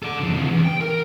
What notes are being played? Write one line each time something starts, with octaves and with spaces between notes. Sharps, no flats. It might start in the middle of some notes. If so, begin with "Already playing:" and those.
A4 D5
F2 D3
C#2 C3
E2
G5
A#4